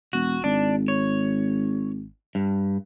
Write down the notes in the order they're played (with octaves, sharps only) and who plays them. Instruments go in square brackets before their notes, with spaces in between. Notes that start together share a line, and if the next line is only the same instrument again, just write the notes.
[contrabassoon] E1 [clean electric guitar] F#4
[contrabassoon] G#1 [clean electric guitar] D4
[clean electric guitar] C#5
G2